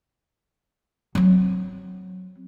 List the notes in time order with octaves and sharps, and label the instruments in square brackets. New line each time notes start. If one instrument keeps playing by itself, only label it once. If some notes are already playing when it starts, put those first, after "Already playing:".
[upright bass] F#3 C4